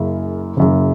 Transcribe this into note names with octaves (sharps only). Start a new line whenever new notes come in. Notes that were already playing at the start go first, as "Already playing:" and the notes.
Already playing: F#1 F#2 C#3
F#1 F#2 C#3